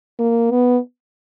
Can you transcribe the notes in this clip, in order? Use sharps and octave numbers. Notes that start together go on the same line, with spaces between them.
A#3
B3